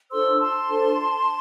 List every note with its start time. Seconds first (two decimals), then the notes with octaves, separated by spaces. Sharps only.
0.11 D4 F4 A4 C5 C6 E6
0.40 A5 C6
0.69 D4 F4 A4 C5